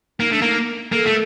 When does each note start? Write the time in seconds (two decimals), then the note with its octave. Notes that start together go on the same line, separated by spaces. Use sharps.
0.20 A#3 D#4
0.31 A3 D4
0.42 A#3 D#4
0.92 A#3 A4
1.06 A3